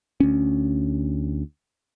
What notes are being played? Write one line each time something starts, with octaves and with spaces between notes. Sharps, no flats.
D2 C#4